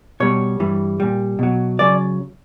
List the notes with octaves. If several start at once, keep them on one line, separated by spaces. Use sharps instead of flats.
B2 G3 C#5
G2 E3 G3
A#2 G3
B2 F#3
C#3 F#3 D5